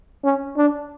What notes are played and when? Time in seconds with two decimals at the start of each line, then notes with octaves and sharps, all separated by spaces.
0.24 C#4
0.57 D4